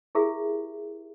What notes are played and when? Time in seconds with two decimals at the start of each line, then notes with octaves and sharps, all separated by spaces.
0.15 E4 G4 G#4 A#4 E5